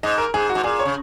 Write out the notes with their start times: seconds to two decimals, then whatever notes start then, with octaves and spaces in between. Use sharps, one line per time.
0.03 G#2 D#5
0.18 A#4
0.34 G#2 G#4
0.49 F#4
0.55 G#2
0.63 A#2 G#4
0.79 C#5
0.85 C#3